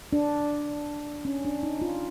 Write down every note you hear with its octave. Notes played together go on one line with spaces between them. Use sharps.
D4
C#4
D4
D#4
F4